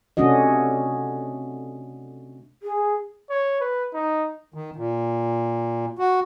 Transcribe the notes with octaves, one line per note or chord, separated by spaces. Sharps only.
C3 A3 C#4 D4 F#4 D#5
G#4
C#5
B4
D#4
D#3
A#2
F#4